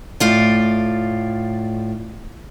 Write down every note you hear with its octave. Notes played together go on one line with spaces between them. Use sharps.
A2 F4 D5